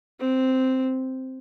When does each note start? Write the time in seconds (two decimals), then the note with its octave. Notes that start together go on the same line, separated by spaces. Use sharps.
0.19 C4